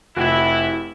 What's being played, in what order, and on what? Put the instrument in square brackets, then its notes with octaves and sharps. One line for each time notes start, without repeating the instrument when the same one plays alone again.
[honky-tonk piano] F1 F#4 [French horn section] E4